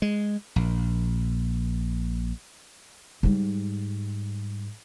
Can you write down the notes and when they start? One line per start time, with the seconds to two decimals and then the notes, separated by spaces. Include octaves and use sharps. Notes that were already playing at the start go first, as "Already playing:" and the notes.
0.02 G#3
0.56 A#1
3.23 G#2 G3